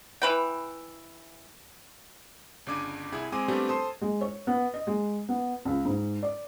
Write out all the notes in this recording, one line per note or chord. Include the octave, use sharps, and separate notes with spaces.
E3 B4 G5
G1 C#3 D4 D6 G#6 D#7
C2 E4 G#4 G#6
G#3 C4 G#5 D6 D#7
G3 A3 B3 C4 D4 G4
A4 C5 A5 C6 D#6
G#3
C#5
B3
D#5
G#3
B3
C#2
G#2
D5